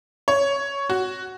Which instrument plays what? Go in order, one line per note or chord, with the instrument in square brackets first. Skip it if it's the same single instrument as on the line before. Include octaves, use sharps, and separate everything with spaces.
[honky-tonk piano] C#5
F#4